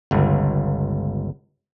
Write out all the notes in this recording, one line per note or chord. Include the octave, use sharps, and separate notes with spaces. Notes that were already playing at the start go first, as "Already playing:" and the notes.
G1 C#2